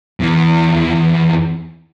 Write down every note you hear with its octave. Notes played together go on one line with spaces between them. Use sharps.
E2 E3